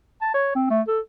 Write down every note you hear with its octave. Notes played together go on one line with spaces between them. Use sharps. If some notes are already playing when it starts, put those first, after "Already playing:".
A5
C#5
C4
A3
A4